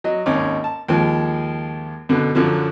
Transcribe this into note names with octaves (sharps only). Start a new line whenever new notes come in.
F#3 D#5
G#1 D#2 C#4 D#4 D6
A5
D#2 F3 G#3
F#2 B2 D3
F#2 D3 F3 F#3